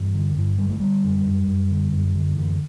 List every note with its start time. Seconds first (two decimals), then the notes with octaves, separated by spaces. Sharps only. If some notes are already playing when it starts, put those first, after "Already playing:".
Already playing: G2 E3
0.15 D3
0.36 G2
0.58 D3 G3
0.69 A3
0.80 D3 G3
1.04 F#2
1.26 F#2
1.47 F#2
1.71 D3
1.92 F#2
2.14 D3
2.37 F#2 E3